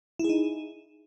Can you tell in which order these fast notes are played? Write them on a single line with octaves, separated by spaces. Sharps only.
E4 G#4 D#4